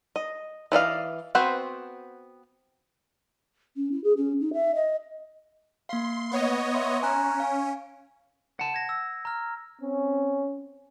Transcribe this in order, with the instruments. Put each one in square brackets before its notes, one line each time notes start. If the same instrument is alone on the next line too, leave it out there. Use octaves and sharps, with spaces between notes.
[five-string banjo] D#5
E3 D5 D#5 F5
B3 C4 F#4 B4 C5
[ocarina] C#4
E4
G#4
C#4
D#4
E5
D#5
[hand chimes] A#3 F5 [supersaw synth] C6
[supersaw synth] B3 C#5 D#5
[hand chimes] E5 C6
[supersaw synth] C#4 [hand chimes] G#5 A#5 F#6
[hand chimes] F5 G#5
[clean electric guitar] F#5 A5
[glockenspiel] G#6 A#6
E6
A#5 F6
[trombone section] C4 C#4